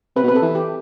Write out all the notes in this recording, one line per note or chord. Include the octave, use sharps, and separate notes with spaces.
C3 B4
B2
C3 B4
A4
E3
G4